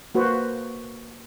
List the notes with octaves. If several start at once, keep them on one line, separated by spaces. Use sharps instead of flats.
A#3 F#4 B4 C5